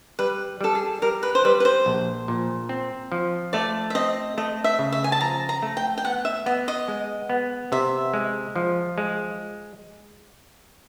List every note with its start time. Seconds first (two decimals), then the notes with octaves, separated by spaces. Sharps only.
0.19 G3 B4
0.61 G3 A4
0.75 G#4
1.02 G3 A#4
1.23 B4
1.35 C5
1.45 G3 B4
1.60 B4
1.65 C5
1.86 A#1
2.28 A#2
2.69 C4
3.12 F3
3.53 A3 D5
3.90 E5
3.95 C4 D#5
4.38 A3 D#5
4.64 E5
4.79 C#3
4.92 E5
5.04 G#5
5.12 A5
5.21 F3 A#5
5.49 A#5
5.62 A3
5.77 G5
5.98 G5
6.05 B3 F#5
6.25 E5
6.46 B3 D#5
6.68 D#5
6.88 G#3
7.30 B3
7.72 C3 E5
8.14 G#3
8.56 F3
8.98 G#3